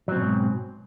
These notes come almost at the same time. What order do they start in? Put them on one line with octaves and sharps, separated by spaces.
F#3 C4 B2 G#2